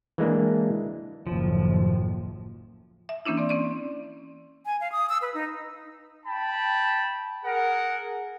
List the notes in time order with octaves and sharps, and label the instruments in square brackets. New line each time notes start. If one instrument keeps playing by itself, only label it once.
[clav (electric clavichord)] E3 G#3 A#3 D4
[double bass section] F#1 D#2 A2 [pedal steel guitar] F3
[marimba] E5
E3 A#3 C#4 D4 E4
C4 D5
C4 C#4 D5
[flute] G#5
F5
D#6
E6
B4
D#4
[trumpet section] G5 A5 B5
G#4 A#4 F#5